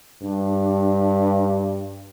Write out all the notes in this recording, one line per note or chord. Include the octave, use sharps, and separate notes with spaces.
G2 D4